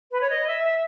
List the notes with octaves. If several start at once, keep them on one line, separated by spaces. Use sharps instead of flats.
B4
C#5
D#5
E5
E5